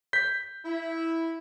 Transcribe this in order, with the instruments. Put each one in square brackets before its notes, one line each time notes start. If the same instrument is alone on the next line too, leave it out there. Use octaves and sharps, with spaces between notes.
[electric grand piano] G6 B6
[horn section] E4